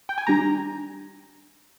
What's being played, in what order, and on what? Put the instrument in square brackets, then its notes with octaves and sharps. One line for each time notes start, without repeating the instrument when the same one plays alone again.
[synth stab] G5
G#5
D#3 G3 D4 A#5